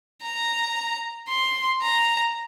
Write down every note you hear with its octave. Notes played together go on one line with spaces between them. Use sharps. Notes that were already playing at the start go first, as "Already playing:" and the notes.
A#5
C6
A#5